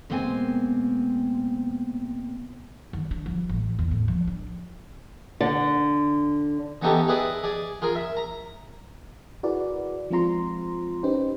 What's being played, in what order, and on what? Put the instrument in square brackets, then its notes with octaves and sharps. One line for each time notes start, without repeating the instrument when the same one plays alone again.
[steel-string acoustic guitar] B2 G#3 A#3 C4 C5 G#5
[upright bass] D#3
D4
F3
A1
E2
A2
F3
D4
[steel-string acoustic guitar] D3
[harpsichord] E3 B3 C#4 D#4 G4 A4
E4 G#4 B4 D5 D#5
G#4 D5
F4 G#4 A#4
E5
A#5
[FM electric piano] E4 F#4 G#4 A#4 B4 D5
F3 G#3 C4 F4 A#5 C6
C#4 D#4 G4 B4 C5